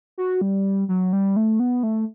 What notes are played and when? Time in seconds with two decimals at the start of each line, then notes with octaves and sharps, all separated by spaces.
0.18 F#4
0.41 G3
0.89 F#3
1.13 G3
1.36 A3
1.60 B3
1.83 A3